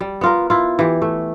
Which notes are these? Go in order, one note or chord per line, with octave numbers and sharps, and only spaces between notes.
G3
B3 F4 A#4
E4 F4
E3 G4
A3